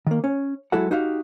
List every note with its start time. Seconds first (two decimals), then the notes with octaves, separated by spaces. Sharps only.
0.07 D#3 A#3
0.24 C#4
0.72 F#3 G#3 E4 F#4 A4 F#5
0.91 D#4 F#4 G4 F5